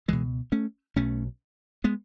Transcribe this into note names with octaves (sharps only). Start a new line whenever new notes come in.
C#2 B2 E3 G#3
A3 C#4
B1 B2 A3 C#4
G#3 B3